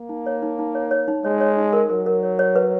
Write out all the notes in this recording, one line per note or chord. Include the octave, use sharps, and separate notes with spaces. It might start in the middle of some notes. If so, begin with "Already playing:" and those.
Already playing: A#3
D#4
C#5
D#4
D#4
C#5
C#5
D#4
G#3 C#5
C#5
D#4
A#4
F#3 A#4
A#4
C#5
C#5
B4